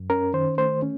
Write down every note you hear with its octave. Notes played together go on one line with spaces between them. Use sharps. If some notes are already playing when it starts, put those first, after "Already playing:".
Already playing: F#2
C#4 A#4
D#3 C5
A3 C5
C#4